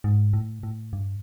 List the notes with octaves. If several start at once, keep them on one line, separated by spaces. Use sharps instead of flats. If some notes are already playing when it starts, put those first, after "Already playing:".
G#2
A2
A2
G2